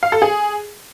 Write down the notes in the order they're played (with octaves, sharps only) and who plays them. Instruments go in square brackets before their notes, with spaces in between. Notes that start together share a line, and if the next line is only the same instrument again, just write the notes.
[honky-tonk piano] F5
A4
G#4